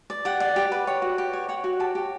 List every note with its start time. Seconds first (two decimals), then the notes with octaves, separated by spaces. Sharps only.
0.10 D5
0.25 G4 F#5
0.40 D5
0.56 G4
0.72 B4
0.87 C#5
1.02 F#4
1.18 G4
1.33 C#5
1.49 C#5 F#5
1.64 F#4
1.80 G4 A5
1.95 G4